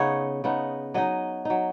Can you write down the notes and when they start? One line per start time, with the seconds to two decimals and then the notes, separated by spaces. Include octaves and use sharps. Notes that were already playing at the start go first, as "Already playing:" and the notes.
Already playing: C#3 B3 D#4 C#5
0.44 C#3 B3 D#4
0.94 F#3 D#4 D#5
1.45 F#3 D#4